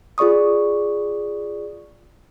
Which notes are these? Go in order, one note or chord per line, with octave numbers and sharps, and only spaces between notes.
F4 G#4 D5 C#6 D#6